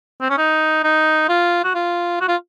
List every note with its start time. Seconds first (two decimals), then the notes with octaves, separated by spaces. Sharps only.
0.21 C4
0.30 C#4
0.38 D#4
0.84 D#4
1.29 F4
1.64 F#4
1.75 F4
2.21 F#4
2.28 F4